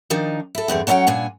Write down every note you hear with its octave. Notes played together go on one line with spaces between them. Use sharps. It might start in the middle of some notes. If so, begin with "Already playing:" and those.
D#3 F3 D4 D#4
E4 A4
E2 G2 C4 G#4
F#3 C#4 D5 E5 F#5 G5
G2 A#2 D4 G#5